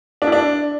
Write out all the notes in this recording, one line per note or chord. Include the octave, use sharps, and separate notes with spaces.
D4
E4
D4